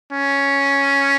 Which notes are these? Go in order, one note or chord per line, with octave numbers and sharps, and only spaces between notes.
C#4